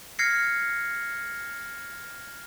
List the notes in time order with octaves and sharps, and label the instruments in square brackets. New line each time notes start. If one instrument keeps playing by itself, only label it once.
[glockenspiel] F6 G#6 A#6 C7 C#7